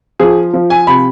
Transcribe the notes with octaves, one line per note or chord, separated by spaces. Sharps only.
F3 G#4
F3
G#5
C3 B5